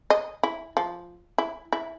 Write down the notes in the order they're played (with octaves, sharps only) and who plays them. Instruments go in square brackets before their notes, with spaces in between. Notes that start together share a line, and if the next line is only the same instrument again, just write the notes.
[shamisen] D#5
E4
F3
E4
E4